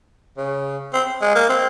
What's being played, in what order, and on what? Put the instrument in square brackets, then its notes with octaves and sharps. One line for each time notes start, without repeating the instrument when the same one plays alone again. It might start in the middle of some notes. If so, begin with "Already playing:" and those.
[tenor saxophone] C#3
C4
G#3
A#3
C4